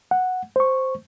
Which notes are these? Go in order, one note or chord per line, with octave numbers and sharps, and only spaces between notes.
F#5
C5 C#6